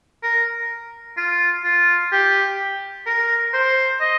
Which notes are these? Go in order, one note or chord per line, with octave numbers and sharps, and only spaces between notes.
A#4
F4
F4
G4
A#4
C5
D#5